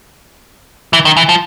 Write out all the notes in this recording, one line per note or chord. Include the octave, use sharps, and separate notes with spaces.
E3
D#3
E3
F3